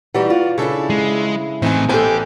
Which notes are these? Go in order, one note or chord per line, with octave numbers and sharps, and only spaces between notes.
E3 G3 D#4 F#4 D5 F#5
F4
C#3 D4 E4 A4 C#5
G#3
A2 E3 C4 D#4 G#5
A1 B3 G4 A4 C5 G#5